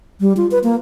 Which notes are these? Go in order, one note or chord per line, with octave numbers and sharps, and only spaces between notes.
G3
F4
B4
A#3